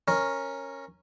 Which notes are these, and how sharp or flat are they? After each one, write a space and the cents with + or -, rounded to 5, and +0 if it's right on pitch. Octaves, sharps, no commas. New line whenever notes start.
C#4 -10 A#4 +0